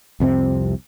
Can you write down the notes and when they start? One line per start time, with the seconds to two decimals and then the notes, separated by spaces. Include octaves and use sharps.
0.20 C2 F2 C3 C4